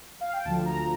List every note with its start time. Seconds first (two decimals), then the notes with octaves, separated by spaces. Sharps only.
0.21 F5
0.33 G5
0.45 D2 D3 F3 A5
0.66 A#5